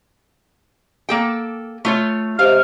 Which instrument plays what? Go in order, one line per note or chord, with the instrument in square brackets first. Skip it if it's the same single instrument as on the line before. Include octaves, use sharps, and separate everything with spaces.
[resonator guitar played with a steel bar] A#3 A4 G5
A3 F4 C#5
[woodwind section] C3 G#3 F6 [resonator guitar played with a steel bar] F5